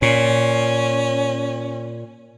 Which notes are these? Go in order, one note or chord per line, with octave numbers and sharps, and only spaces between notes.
A#2 C#4